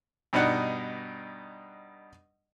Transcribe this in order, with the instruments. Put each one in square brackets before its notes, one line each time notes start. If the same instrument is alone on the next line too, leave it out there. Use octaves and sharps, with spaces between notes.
[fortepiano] G2 B2 D4 D#4 F#5